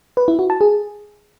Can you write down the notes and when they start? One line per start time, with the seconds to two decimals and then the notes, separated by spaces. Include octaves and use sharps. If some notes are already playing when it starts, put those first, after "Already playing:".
0.17 B4
0.28 E4
0.39 F#4
0.50 A5
0.61 G#4